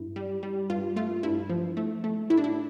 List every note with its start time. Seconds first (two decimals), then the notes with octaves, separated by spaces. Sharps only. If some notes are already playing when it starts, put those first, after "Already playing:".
Already playing: G2 E4
0.16 G3
0.43 G3
0.70 G2 F4
0.96 A3 F4
1.23 G2 E4
1.50 F3
1.77 A3
2.04 A3
2.30 A2 E4
2.37 D4
2.44 E4